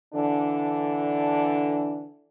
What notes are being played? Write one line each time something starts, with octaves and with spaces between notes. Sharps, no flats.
D3 E3 D4